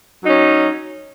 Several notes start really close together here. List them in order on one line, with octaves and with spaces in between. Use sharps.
F#3 D#4 C#4